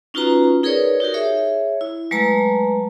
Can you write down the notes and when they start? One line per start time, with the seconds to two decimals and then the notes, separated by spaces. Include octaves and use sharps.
0.14 C#4 D#4 F4 F#4 B4 A#5
0.63 D#4 G#4 A#4 B4 C#5 D5
1.00 D#4 F#4 G4 A#4
1.14 G#4 C#5 E5
1.81 E4
2.11 F#3 G#3 A3 B4 A5 A#5